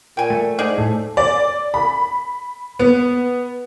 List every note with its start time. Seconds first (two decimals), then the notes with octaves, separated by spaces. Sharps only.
0.17 A#2 G5 G#5
0.30 A3
0.59 G#2 D#4 G#4 D5
0.78 A2 A4
1.17 D5
1.74 B5
2.79 B3